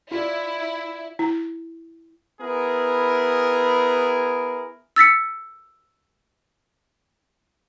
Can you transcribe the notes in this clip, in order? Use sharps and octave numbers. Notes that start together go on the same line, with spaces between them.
E4 F4 D5
E4
B3 E4 G#4 A#4
E6 A6 B6 C#7